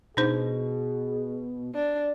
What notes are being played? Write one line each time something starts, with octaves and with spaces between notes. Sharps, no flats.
B2 D4 D#4 G#4 C5
D4